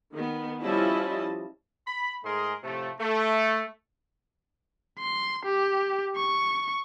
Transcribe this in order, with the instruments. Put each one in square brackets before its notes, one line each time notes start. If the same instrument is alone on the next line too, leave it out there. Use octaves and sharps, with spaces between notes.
[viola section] D#3 B3
F3 G3 C#4 E4 D#5 A5
[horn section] B5
G#2 A3 G#4 A#4 D#5 C6
A2 C3 F3 A3
A3
[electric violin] C6
G4
C#6